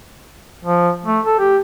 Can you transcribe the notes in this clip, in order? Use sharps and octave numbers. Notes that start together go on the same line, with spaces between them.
F3
A3
A4
G4